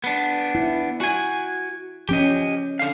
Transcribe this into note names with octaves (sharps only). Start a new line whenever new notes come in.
B3 D4
E4
F#4 G#5
F3 C#4 G4 D#5
D3 F5